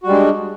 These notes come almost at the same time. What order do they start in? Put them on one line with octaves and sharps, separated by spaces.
F#4 G3 G#3 D4